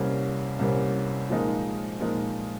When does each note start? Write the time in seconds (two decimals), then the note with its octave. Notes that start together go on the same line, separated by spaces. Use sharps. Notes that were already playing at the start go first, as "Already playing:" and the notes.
Already playing: C2 C3 G3 A#3 C#4
0.59 C2 C3 G3 A#3 C#4
1.30 A#2 F3 G#3 D#4 A#4
2.00 A#2 F3 G#3 D#4 A#4